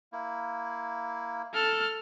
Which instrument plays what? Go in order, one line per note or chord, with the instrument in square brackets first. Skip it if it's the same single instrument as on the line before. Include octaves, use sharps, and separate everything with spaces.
[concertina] A#3 E4
[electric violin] A4 F6